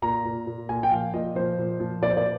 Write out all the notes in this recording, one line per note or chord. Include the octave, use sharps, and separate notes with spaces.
A#2 A#5
A#2
A#2
A#2 G#5
G5
F3 F5
A#2 D#5
F3 C5
A#2
F3
A#2 D5
C5
D5